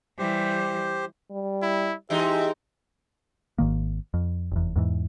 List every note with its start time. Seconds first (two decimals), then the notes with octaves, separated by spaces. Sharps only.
0.19 E3 G3 G4 C5
1.31 G3
1.62 E4
2.10 E3 G#3 D#4 G4 E5
3.58 G#1 D#3 A#3
4.14 F2
4.52 F1 E2
4.76 E2 G#2 E3